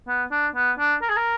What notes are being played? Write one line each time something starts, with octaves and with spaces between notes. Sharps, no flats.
B3
D4
B3
D4
A#4
G#4
A#4